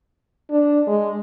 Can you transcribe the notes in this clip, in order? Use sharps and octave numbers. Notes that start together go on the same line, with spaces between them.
D4
G#3